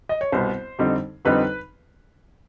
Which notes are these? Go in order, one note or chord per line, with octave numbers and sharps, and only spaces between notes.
D#5
C#5
C2 B2 G3 B3 C5
F2 D3 G3 C4 D#4
F2 D3 G3 C4 D#4 B4